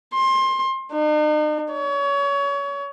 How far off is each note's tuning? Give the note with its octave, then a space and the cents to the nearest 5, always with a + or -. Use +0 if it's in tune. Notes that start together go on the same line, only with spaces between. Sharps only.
C6 +25
D#4 -45
C#5 +25